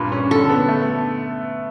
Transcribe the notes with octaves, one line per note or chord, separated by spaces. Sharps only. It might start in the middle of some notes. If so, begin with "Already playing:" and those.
Already playing: G2 A#2 B4
C#4
D3 A4
B3
A3